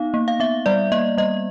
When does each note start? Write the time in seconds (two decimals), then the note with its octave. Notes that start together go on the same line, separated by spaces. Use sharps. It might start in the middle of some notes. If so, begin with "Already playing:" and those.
Already playing: B3 D#4 F5
0.14 A#3
0.28 F5
0.40 B3 E5
0.66 G3 D5
0.92 A#3 D#5
1.18 G3 D#5